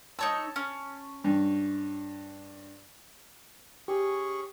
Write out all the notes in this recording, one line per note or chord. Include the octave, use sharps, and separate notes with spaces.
D#4 C#5 A5 E6
C#4
G2
C#4 G4 G#4 C#6